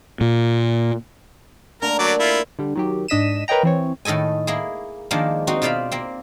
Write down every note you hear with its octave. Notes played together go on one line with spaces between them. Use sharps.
A#2
D3 A3 A#3 A#4 A#5
F#3 D5
E4 F4
D3 G3
D#3 F#3 G4
G#2 D4 D#5 B6 D#7 E7
A#4 B4 C#5 D#5 G5 A#5
E3 C4 C#5
A2 D#3 A4 D#5 G#5
A#3 E4 G#4
D#3 F3 G#3 A#3 D4
C4 D#4 F#4
B2 F4 C5 D5 F5 B5
A#3 C4